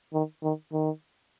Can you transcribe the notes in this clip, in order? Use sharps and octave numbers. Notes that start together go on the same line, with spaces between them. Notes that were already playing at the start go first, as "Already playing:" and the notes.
D#3
D#3
D#3